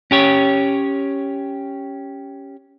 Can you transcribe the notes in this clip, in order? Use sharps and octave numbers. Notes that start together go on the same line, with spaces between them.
C#4 G4 C#5